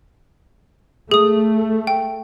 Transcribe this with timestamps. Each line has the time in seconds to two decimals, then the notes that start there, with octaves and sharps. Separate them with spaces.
1.11 A3 G#4 D#6
1.87 G5